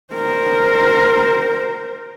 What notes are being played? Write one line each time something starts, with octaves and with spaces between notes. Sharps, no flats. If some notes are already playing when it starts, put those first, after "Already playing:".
A#4 C5